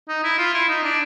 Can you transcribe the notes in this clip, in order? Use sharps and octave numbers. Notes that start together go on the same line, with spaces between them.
D#4
E4
F4
E4
D#4
D4